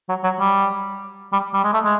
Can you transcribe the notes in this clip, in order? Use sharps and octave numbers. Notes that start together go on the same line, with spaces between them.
F#3
F#3
G3
G3
G3
G#3
A3
G#3